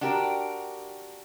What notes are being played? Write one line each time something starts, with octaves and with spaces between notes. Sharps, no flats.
D4 F#4 G4 A#4